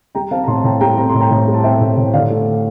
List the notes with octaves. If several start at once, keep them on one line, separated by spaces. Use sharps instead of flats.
G3 G5 A#5
C4 F5 A5
A#5
A2 A5 C6
A5
A2 G5 A#5
G3 G5 A#5
C4 A#5
A2 C6
G5 A#5
A2
G3
A5
C4 E5 G5
A2
A2
D3 D5 F5
A3